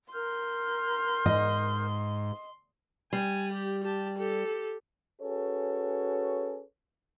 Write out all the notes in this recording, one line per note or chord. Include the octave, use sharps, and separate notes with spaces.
A#4 C6 F6 G6
G#2 D#5
G3 G#5
G4
G4 A5
G4 A4
C#4 F#4 G#4 A4 B4 C#5